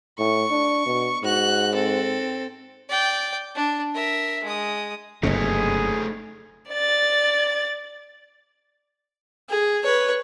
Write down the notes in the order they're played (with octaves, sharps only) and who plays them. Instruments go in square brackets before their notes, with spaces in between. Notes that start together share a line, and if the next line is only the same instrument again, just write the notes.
[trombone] A2 [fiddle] C#6
[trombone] D4
B2
[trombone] G#2 [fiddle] F#4 F#6
[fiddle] C4 A4
D5 G5
D4
A#4 E5
G#3 D#6
[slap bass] F#1 G2 C3 [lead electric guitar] A3 D#4 [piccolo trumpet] G#4
[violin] D5 A6
[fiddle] G#4
B4 C#5